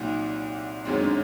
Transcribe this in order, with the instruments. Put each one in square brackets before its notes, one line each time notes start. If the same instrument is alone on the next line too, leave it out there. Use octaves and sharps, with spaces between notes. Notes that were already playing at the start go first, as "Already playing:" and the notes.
Already playing: [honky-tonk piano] C2 A#2 F#3 [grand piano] D#4
[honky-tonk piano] G1 F#2 D#3 G#3 C4
[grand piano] D4